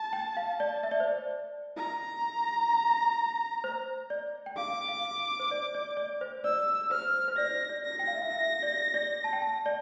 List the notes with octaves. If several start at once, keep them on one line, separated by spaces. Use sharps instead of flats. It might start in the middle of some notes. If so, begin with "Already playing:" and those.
Already playing: A5
G5
F5
D5
E5
D5
C5
D5
A#5
C5
D5
G5
F5 D6
F5
C5
D5
D5
D5
C5
D5 E6
C5 F6
C5
D5 A#6
D5
A#6
G5
F5
E5
F5
E5
D5
D5
A5
G5
A5
D5